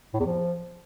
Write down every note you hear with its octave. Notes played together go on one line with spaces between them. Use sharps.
A2
E2
F3